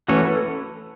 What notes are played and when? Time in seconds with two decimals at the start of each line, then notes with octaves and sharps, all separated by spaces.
0.08 E3 A3 C#4 F#4 B4 C#5
0.24 A4